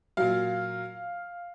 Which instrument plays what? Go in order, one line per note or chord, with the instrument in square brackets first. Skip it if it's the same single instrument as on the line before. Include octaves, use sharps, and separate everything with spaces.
[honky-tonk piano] A#2 F#3 F5